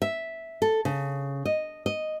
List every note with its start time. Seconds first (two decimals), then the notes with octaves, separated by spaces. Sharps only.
0.02 E5
0.62 A4
0.85 C#3
1.45 D#5
1.86 D#5